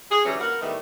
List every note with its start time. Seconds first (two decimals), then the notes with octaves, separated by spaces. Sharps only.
0.10 G#4
0.25 D3 E3 F#3 G3 C#4
0.39 A#3 A#4 B4 F#5
0.61 A2 D#3 G3 A3 B3